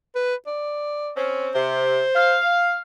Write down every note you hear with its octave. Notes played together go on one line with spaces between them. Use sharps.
B4
D5
C4 C#4
C3 C5
F5